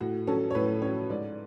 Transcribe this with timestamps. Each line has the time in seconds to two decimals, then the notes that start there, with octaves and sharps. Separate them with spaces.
0.01 A2 F#4
0.27 F#3 C#4 A4
0.50 C#5
0.55 A2 B4
0.82 F#3 C#4 C#5
1.10 G#2 D5